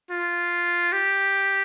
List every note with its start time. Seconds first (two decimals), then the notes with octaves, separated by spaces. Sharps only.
0.10 F4
0.92 G4